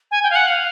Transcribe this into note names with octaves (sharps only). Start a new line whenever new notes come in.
G#5
G5
F5
F#5
F5